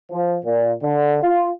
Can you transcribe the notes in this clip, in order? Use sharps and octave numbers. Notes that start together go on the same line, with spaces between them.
F3
A#2
D3
F4